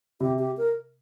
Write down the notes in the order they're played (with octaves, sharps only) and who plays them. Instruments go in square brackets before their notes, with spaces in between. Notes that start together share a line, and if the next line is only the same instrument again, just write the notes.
[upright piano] C3 [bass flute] G4
[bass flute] G4
A#4